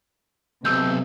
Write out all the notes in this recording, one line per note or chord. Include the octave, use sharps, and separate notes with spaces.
B1 C3 E6 G6